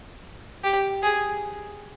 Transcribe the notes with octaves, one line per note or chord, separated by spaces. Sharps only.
G4
G#4